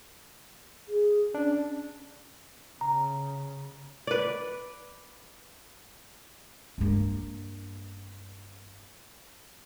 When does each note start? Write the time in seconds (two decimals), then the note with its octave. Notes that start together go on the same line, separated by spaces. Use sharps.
0.89 G#4
1.34 C#4 D4
2.81 C#3 A#5
4.07 B4 D5
6.78 G2 A#3